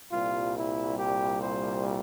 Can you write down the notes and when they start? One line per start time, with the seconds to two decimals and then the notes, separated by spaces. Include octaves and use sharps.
0.12 C2 A#2 G3 F4
0.54 E4
0.97 G4
1.40 C5